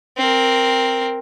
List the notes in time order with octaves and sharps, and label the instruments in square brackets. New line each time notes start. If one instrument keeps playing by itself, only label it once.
[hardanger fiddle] C4 A#4